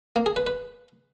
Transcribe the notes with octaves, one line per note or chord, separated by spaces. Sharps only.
A#3
G#4
B4
B4